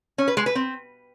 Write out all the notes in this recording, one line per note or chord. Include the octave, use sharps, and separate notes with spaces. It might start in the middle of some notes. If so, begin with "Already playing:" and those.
C#4
B4
G#3
B4
C4